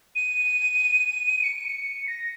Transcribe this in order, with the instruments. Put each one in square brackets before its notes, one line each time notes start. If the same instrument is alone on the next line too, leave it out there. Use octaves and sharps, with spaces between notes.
[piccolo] D#7
C#7
D#7
C#7
A#6